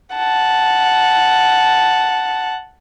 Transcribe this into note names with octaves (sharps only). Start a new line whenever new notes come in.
F#5 A5